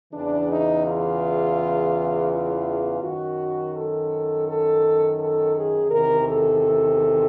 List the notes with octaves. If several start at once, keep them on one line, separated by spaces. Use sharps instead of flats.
E2 C#3 E3 D4
D#4
F4
F4
F#2 D#3 F#4
A4
A4
A4
G#4
E2 C3 D#3 A#4
A4